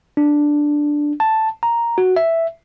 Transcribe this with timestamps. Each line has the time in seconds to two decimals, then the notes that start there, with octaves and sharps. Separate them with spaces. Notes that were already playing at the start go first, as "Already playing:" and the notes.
0.17 D4
1.20 A5
1.63 A#5
1.98 F#4
2.16 E5